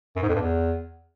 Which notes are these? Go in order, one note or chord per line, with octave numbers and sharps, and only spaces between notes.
F#2
G#2
F2
G2
E2